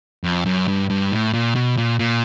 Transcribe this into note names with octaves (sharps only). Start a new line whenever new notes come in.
F2
F#2
G2
G2
A2
A#2
B2
A#2
A#2